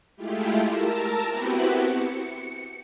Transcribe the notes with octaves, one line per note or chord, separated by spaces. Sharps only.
G#3 A3 E4 F4 G4
A#4 A5 E6 A#6
B3 C4 E4 F#4 G4 B4
C#7